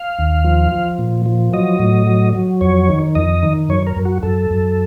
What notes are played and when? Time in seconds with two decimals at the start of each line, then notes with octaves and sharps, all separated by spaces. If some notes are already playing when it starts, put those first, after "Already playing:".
Already playing: F5
0.18 D#2
0.44 F3
0.72 F3
0.99 A#2
1.26 F3
1.53 F#3 D#5
1.79 A2
2.07 F#3
2.35 F#3
2.61 F2 C#5
2.89 D#3
3.15 F2 D#5
3.43 D#3
3.69 F#2 C#5
3.87 A#4
3.96 F#2
4.05 F#4
4.23 F#2 A4
4.51 F#2